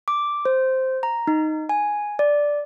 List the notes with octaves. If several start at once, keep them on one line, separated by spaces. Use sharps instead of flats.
D6
C5
A#5
D#4
G#5
D5